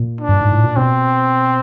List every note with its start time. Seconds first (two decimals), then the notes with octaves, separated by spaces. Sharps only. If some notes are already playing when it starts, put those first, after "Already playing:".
Already playing: A#2
0.21 D4
0.29 G2
0.41 G#2
0.52 A2
0.64 A#2
0.76 B2 C4